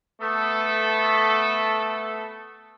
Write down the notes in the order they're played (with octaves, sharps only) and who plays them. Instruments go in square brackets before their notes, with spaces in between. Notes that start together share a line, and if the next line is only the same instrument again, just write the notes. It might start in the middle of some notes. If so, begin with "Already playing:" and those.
[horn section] A3 B3 A4